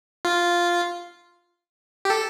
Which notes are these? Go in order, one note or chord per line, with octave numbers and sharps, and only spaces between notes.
F4
G4
A4